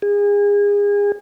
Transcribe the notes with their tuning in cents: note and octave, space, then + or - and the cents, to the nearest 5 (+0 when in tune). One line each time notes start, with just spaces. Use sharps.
G#4 -30